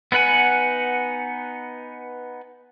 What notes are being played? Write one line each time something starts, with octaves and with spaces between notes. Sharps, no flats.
B3 D#4 B4 F#5 G#5